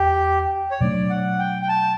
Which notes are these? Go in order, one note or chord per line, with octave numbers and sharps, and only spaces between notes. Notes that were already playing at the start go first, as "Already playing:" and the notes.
Already playing: E2 G4
C#5
B2 F#3 A3 D4 D5
F#5
G5
G5
A5